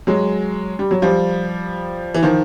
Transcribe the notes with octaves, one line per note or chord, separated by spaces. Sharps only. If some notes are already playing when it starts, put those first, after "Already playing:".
F#3 G#3
G3
F#3
F3 G3
E3
D#3 F3